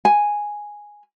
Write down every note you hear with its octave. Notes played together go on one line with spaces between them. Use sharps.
G#5